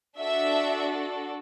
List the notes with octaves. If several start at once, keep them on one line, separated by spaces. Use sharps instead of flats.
D4 F#4 A4 E5